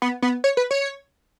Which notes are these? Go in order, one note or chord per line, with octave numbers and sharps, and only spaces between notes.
B3
B3
C#5
B4
C#5